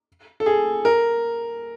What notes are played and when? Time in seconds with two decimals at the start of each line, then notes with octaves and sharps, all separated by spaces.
0.40 A4
0.46 G#4
0.85 A#4